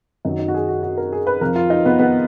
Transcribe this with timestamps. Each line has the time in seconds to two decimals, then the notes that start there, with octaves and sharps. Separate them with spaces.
0.25 F#2 D#3 F#3 D#4
0.39 D#4
0.48 F#4
0.54 G#4
0.68 F#4
0.83 F#4
0.98 A#4
1.12 G#4
1.27 B4
1.41 F2 F3 A#4
1.56 F4
1.70 D#4
1.85 B3
1.99 B3